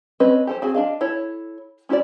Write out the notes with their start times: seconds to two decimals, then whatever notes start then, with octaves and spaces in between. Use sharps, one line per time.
0.20 C4 C#4 B4 D#5
0.47 G4 A4 C5
0.62 C4 F#4 G#4
0.75 D4 D#5 F5
1.01 E4 A4 C#5
1.89 C#4 E4 F#4 A#4 D5